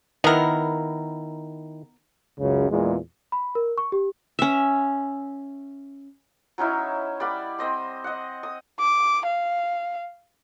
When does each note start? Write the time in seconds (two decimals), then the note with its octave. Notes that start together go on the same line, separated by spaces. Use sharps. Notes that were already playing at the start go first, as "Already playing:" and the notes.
0.24 D#3 B3 E4 A#4
2.40 C#2 F#2 C#3
2.70 E2 A#2 G#3
3.32 B5
3.55 A#4
3.78 C#6
3.92 G4
4.39 C#4 E5
6.58 F#3 C#4 D#4 E4
7.20 G3 D5 F#5 B5
7.59 C4 D#5 C6
8.04 D#5 F#5
8.43 D#6
8.80 D6
9.26 F5